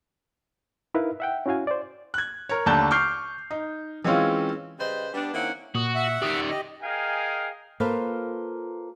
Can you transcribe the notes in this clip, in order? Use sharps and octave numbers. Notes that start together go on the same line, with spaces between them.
D#4 E4 A#4 B4 F5
E5 F#5 G5
C#4 E4 F#4 F5 G#5
C5 D5
F#6 G#6
A#4 C#5
D#2 D3 A3 D4 A5 G6
C#6 D6 F6 G6 C7
D#4
E3 G#3 C4 C#4 F4
C#3 G3 B4 C5 D#5
G3 B3 D4
D#3 A#3 C4 C#4 E4 F#5
A#2 F#4 D#6
E5 F#5
D#3 G4 D5 D#6
G4 D#5
G#4 A#4 D#5 F5 G5 G#5
A#3 F4 A4 B4 C5 F5